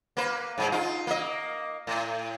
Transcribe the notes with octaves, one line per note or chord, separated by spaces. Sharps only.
A#3 B4
G#2 F#3 G#3
D#4 F4
A#3 D#5
A2